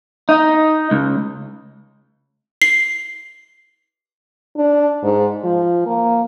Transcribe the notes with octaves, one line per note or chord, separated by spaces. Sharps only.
D#4
C#2
C7
D4
G#2
F3
A#3